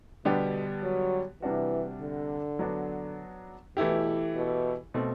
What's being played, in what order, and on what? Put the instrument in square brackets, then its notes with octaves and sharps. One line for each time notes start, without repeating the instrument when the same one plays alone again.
[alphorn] B2 [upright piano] D3 G3 B3 D4 G4
[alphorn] F#3
[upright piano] C3 G3 D4 F#4 [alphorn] E3
[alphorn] D3
[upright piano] F#3 B3 D4 F#4
[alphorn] B2 [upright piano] E3 A3 E4 G4
[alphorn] B2
[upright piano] B2 A3 C4